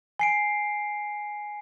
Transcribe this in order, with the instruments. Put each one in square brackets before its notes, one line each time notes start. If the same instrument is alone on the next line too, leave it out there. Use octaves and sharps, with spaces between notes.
[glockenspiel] G#5 C7 D7